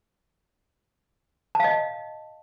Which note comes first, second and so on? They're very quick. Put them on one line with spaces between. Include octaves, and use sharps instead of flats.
A5 F5 D#5